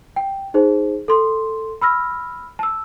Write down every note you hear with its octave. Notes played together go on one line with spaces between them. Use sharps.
G5
D#4 G#4 C5
A4 C6
B5 E6 F6 A#6
A5 E6